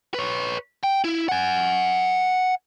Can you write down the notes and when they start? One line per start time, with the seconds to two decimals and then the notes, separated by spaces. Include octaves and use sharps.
0.14 B4 C#5
0.84 G5
1.04 E4
1.29 F#5 G#5